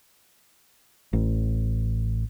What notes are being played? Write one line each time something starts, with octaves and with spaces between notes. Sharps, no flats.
A1